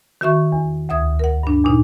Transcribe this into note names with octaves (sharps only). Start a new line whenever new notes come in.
D#3 F#4 E5 C#6
E2
D2 E5 D#6 G#6
A#4 F#5
G2 D4
E2 A#2 D#4